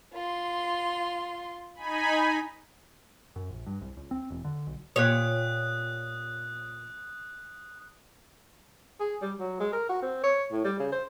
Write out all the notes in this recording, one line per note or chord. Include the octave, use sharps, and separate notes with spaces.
F4 C6
D#4 G#5 B5
F#2
A#1
G2
C2
C#2
C4
E1
D3
B1
A#2 G4 C#5 D#6 F#6
G#4
G3
F#3
G#3
A#4
F#4
C4
C#5
A2
G3
C#3
C5